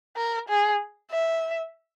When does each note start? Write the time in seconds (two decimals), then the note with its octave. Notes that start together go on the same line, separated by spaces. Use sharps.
0.17 A#4
0.49 G#4
1.10 E5